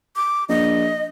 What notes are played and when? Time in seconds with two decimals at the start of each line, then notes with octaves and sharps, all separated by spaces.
0.16 D6
0.49 A#1 D#5